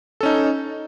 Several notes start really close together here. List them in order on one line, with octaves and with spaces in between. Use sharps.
A4 C#4 D#4